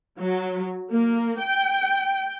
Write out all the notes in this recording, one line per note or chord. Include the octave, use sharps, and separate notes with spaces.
F#3
A#3
G5